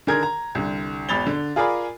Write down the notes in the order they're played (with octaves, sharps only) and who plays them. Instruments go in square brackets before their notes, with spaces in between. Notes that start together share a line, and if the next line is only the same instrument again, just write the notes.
[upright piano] D3 D#3 G#4 A#4 G#6
A#5
C2 D3
G#1 E2 B5 A6 F7 G7
D3
F4 G#4 A#4 D5 G#5 B5